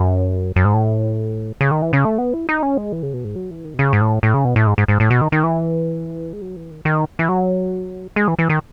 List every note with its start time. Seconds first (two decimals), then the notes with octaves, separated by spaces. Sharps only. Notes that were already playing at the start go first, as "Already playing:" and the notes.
Already playing: F#2
0.56 F#2
0.65 G#2
0.74 A2
1.61 C#3
1.71 D#3
1.82 E3
1.93 C#3
2.05 A3
2.18 B3
2.33 E4
2.49 D#4
2.63 C#4
2.77 G#3
2.92 E3
3.03 C#3
3.13 B2
3.24 G#2
3.36 F#3
3.51 E3
3.65 D#3
3.74 B2
3.79 C#3
3.93 G#2
4.01 A2
4.23 A2
4.34 C#3
4.45 B2
4.56 A2
4.67 G#2
4.78 G#2
4.88 G#2
5.00 A2
5.10 B2
5.21 D#3
5.32 D#3
5.43 E3
6.33 G#3
6.41 F#3
6.56 E3
6.71 D#3
6.85 D#3
7.19 E3
7.29 F#3
8.16 G#3
8.28 E3
8.39 E3
8.50 D#3